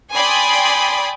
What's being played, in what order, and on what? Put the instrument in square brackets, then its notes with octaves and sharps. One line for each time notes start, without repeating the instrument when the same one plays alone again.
[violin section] D5 G5 G#5 B5 C6 D#6